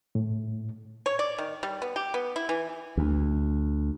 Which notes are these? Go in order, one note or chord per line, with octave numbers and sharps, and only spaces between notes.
A2
C#5
D5
D#3
G3
B3
G4
B3
E4
E3
D2